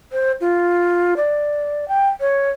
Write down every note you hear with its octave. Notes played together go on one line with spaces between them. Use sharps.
C5
F4
D5
G5
C#5